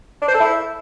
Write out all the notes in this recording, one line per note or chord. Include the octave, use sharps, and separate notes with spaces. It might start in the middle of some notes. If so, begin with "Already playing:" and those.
D4
C5
A4
E4